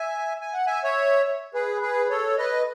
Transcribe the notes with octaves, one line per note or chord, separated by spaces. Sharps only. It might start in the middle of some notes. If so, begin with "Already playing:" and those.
Already playing: E5 G#5
G#5
F#5
E5 G#5
C#5 E5
G#4 B4
G#4 B4
A4 C#5
B4 D#5